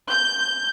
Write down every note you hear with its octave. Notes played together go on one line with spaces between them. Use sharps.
G6